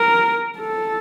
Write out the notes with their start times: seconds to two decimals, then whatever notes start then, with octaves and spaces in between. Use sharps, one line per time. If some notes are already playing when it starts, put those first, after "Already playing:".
Already playing: A#4
0.58 A4